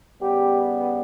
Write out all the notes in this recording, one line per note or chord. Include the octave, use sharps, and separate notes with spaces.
C#3 G3 B3 G4